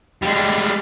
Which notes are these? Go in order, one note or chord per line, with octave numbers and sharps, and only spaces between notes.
G3 G#3